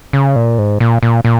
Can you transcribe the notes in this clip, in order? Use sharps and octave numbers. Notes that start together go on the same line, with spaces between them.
C#3
A#2
G#2
A#2
A#2
A#2